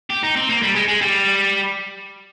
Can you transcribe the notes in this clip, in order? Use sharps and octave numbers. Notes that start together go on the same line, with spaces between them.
G4
D#4
C4
A#3
G3
G#3
G#3
G3